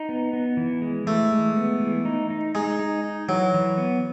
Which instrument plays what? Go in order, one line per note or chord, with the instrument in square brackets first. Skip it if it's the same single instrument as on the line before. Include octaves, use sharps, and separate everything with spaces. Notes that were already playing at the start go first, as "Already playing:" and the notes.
Already playing: [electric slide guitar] D#4
B3
B3
E3
G#3
[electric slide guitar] E3 [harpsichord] A3
[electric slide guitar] G#3
B3
E3
D#4
D#4
[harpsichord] G#3 [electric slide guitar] D#4
[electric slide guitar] D#4
D#4
[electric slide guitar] E3 [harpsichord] F#3
[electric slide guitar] E3
B3